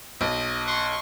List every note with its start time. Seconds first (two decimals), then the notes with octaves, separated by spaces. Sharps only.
0.21 B1 D#5
0.66 F#5 C6 C#6